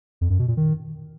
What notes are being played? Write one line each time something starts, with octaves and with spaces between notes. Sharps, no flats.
F2
F#2
B2
A#2
D#3